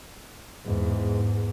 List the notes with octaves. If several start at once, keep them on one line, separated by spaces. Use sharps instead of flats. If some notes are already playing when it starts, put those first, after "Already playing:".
E2 G#2